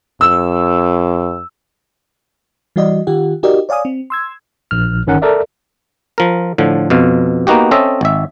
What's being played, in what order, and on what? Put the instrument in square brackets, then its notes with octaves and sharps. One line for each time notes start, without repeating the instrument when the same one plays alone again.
[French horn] F2 [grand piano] E6
[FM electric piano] E3 G3 F#4 D5 D#5
D#3 F4 G4 F#5
D#4 F#4 G4 A#4 D5 D#5
C#5 D5 F5 G#5 D#6
C4
C6 E6 G#6
[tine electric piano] A#1 F6
G1 D#3 C#4 A#4 F#5
A4 A#4 D5 E5
[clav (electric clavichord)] F3 A#4
A2 D3 F3
F2 B2 F5
A#3 B3 D#4 F#4 G4
C4 C#4 A4 D#5 E5
G#1 E5